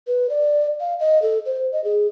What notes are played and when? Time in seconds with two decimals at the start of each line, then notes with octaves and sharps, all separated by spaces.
0.07 B4
0.30 D5
0.80 F5
1.00 D#5
1.22 A4
1.46 C5
1.72 D#5
1.84 G#4